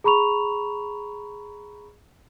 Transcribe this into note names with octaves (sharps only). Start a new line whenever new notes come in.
G#4 A#5 B5 C#6 F7